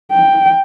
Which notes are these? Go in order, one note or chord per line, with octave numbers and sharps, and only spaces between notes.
G5